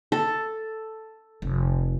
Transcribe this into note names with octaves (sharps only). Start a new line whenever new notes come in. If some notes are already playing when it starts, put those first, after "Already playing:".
A4
F1